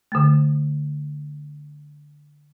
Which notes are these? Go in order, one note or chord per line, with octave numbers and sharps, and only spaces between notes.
D3 A3